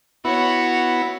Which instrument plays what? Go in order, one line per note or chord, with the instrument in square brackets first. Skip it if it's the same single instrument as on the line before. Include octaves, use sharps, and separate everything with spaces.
[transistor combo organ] B3 E4 [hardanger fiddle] F#4 C#5